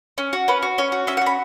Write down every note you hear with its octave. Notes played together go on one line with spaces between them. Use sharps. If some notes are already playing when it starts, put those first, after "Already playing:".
C#4
F#4
C#4 B4
F#4
C#4 C#5
F#4
C#4 E5
F#5
F#4
B5